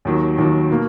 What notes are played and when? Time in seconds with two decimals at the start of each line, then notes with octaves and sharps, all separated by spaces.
0.05 D#2 D#3 F#3
0.38 D#2 D#3 F#3
0.70 B2 A#3